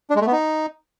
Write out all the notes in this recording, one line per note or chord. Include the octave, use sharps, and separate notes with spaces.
D4
G#3
A3
B3
D#4